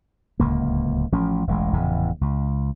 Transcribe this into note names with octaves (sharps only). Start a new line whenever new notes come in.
D1 C#2 A#3
A1 F3 A3 C#4
E1 A1 G#3
F1 E2 A2 C#3
C#2